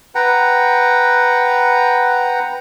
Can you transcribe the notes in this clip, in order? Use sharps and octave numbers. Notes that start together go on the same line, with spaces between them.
B4 F#5 G5 A#5